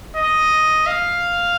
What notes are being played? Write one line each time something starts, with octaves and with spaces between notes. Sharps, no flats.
D#5
F5